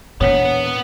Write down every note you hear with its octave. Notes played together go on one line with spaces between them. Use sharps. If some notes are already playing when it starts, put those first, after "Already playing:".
E1 A#2 B3 C#5 F#5 B6